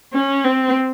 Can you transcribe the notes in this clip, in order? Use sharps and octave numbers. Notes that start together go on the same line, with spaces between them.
C#4
C4